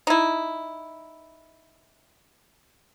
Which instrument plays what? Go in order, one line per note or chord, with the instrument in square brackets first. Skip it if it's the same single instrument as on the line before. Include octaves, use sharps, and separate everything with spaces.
[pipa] D#4 E4